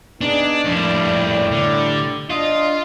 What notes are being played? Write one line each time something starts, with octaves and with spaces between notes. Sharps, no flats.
B3 D4 D#4 G#4
F2 A2 G3 D4
D3
D4 F4 D#5